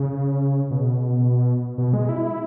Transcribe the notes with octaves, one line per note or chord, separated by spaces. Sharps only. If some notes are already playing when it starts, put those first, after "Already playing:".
Already playing: C#3
B2
B2
G#3
E4
E4